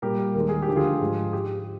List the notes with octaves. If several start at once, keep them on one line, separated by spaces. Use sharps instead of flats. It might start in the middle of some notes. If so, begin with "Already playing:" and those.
A#2 G3 A#3 G4 A#4
D#2 D#3 G#3 A#4
G#4
G4
D2 D3 F3
F4 G#4
G#2 F3 G#3
G4